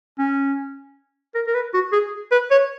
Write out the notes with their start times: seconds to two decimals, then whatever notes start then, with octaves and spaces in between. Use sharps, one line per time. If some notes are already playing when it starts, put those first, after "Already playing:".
0.19 C#4
1.35 A#4
1.47 A#4
1.54 B4
1.74 F#4
1.93 G#4
2.32 B4
2.51 C#5